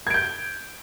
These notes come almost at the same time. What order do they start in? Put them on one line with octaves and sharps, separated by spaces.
G#6 D7 G6